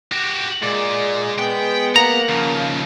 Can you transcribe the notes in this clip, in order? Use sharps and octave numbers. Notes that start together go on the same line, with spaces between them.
F#4 G4
A#2 G#3 D5
B3 G5
A#3 F#5 A#5
D#2 C#3 F3